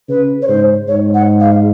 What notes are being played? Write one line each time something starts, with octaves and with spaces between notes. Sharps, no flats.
C#3 B4
C#5
G#2 C5
G#2 C#5
F#5
F5